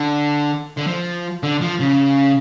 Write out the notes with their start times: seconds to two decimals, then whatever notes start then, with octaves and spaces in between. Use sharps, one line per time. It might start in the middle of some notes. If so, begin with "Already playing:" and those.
Already playing: D3
0.78 D3
0.87 F3
1.43 D3
1.61 F3
1.80 C#3